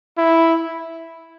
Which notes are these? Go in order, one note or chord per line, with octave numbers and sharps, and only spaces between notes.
E4